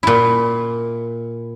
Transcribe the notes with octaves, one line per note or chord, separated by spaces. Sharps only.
A#2 E4